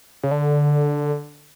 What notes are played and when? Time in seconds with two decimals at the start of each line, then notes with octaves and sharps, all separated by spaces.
0.23 C#3
0.31 D3